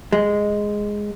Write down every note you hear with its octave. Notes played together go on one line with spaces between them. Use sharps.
G#3